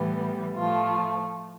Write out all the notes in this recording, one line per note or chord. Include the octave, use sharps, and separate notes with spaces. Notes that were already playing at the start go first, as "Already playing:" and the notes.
Already playing: A2 E3 G3 B3
A2 F3 A3 F4